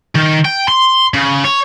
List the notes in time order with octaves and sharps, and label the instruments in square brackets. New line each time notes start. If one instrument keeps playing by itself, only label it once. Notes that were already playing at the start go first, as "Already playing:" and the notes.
[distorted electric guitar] D#3
G5
C6
C#3
C#5